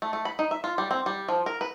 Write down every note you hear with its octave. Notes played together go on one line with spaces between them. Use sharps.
A3
A3
B5
D#4
E5
F4
G3
C4
G3
F3
A#4
B4